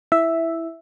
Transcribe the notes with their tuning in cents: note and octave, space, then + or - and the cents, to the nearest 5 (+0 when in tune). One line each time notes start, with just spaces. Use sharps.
E4 +0 E5 +0